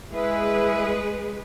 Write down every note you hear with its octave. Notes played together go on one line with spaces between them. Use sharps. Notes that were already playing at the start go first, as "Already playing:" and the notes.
G#3 E4 G#4 B4